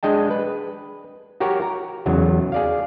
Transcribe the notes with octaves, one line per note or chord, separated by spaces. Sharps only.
G#3 D4 D#5 G5 A5
B4
F#4 G4 A#4 C#5
A#5
E2 C#3 F#3
G#4 D5 F5